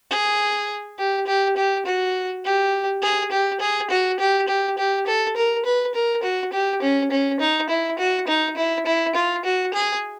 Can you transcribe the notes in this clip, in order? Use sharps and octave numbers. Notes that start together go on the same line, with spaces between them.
G#4
G4
G4
G4
F#4
G4
G#4
G4
G#4
F#4
G4
G4
G4
A4
A#4
B4
A#4
F#4
G4
C#4
C#4
D#4
E4
F#4
D#4
E4
E4
F4
F#4
G#4